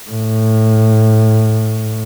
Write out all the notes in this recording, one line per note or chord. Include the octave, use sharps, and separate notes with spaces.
A2